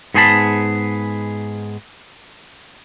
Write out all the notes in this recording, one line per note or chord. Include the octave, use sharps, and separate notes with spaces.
G#2 B3 G#4 C5 A5 B5